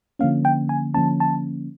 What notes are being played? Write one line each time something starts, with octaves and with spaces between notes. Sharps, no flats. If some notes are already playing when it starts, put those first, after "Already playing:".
D3 F3 A#3 C#4 F5
G5
G#5
D3 F3 A#3 C#4 A5
A5